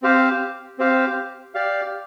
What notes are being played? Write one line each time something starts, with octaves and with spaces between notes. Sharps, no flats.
C4 G4 C5 F5
C4 G4 C5 F5
G4 D5 F5